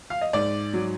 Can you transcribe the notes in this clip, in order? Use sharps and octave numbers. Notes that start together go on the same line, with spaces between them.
F5
D#5
G#2 D5
F#3